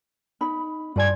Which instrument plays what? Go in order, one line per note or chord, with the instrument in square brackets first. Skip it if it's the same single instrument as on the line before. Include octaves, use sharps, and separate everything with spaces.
[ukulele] D#4 B5
[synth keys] G2 G#6 [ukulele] F4 D5 G#5